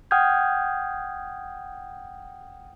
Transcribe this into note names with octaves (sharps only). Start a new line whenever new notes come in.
F#5 G5 D#6 F6 G6 G#6